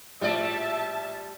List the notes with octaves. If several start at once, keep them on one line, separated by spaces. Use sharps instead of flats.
A#1 A2 F3 G3 D5 E5 A5